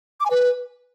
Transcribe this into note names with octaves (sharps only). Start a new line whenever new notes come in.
D6
G#5
B4